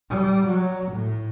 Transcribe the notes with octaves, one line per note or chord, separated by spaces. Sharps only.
G3
F#3
A2